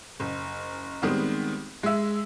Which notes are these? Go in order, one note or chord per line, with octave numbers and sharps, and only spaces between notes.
F#1
D#3 G3 G#3 B3 C4
G#3 E5